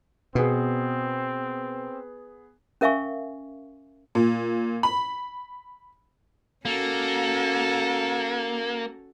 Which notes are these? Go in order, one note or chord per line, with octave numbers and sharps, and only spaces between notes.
B2 B3 C4 G#4
C#4 A#4 E5 F5 G#5 C#6
A#2
B5
A#3 C#4 F#4 A4